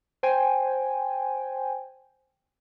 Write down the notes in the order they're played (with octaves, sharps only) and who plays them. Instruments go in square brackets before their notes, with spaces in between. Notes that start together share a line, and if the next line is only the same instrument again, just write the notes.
[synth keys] C5 G5 G#5